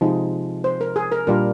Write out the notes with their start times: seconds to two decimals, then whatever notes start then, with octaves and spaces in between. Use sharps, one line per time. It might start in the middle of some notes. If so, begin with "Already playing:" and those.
0.01 C3 F3 G#3 D#4
0.64 C5
0.81 A#4
0.96 G#4
1.12 A#4
1.27 A#2 G3 D4 F4 A#4